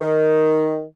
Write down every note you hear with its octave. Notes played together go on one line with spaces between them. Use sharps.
D#3